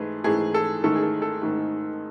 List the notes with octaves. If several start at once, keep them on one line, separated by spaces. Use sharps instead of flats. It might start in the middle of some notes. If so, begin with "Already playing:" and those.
Already playing: G#2 E3 A3 G#4 B4
G#2 E3 A3 G#4
A4
G#2 D#3 A3 A4
G#4
A4
A4
G#2 D#3 A3